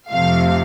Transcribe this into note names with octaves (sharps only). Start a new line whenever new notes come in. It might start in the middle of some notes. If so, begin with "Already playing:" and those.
F2 C3 F3 A3 F5